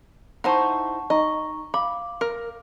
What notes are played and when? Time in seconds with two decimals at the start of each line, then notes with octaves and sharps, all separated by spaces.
0.44 D#4 E4 C5 F#5 A5 C#6
1.10 D#4 D#5 A#5 C#6
1.74 F5 B5 D6
2.21 A#4